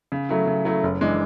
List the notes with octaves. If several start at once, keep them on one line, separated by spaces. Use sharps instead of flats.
C#3
F#3 A3 E4
C#3
F#3 A3 E4
F#1
E3 G#3 D4